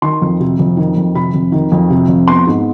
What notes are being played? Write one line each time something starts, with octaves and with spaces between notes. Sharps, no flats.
D#3 C6
F2
C3
F2
D#3
F2
C3 B5
F2
D#3
F2
C3
F2
B3 C6
G#2